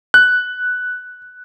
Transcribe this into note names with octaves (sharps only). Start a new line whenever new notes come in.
F#6